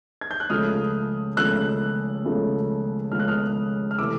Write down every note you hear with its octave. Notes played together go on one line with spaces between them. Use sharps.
G#6
G6
F#6
C#2 C#3 F3 A3 D#6 F6
C#2 C#3 F3 A3 E6 F#6
C#2 C#3 F3 A3
C#2 C#3 F3 A3 F6
F#6
D#6 F6
F6
C3 E3 A3 D6 E6